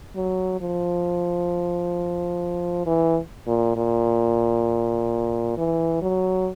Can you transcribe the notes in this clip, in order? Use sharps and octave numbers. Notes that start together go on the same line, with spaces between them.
F#3
F3
E3
A#2
A#2
E3
F#3